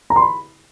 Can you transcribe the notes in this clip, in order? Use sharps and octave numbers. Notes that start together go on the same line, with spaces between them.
A#5
C6
B5